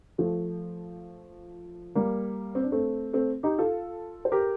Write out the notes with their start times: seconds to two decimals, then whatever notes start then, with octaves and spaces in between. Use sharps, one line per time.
0.18 F3 A3
1.95 G3 A#3
2.55 C4
2.63 D4
2.72 A3 C4
3.13 A3 C4
3.43 D#4 G4
3.58 F4 A4
4.25 C5
4.32 G4 A#4